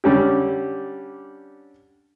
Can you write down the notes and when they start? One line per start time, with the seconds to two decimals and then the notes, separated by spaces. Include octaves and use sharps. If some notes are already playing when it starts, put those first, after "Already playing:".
0.04 D3 G3 C#4 G4